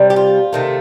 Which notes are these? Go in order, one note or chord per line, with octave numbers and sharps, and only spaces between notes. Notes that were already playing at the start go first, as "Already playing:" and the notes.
Already playing: C3 G3
G4
F4
C3 D#3 A3